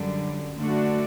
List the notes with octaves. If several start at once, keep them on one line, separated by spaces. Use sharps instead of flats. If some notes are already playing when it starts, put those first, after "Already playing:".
Already playing: F#2 D3 G3
D3 A3 D4 F#4